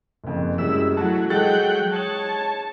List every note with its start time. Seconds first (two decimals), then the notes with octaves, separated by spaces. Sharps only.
0.24 F#1 F2
0.58 F#2 G3 G#3 E4 E6
0.97 F#3 A3 E4 F#4 A5
1.30 F#3 G#3 A4 F#5 G5 G6 A6
1.93 C#5 A5 D#6 F#7